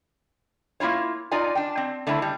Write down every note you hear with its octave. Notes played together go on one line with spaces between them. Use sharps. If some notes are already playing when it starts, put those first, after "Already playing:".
A#3 C#4 E4 F4 C#5
D#4 F4 D5 G#5
D4 G5
C4
D3 A3 C4 D4 E4
G3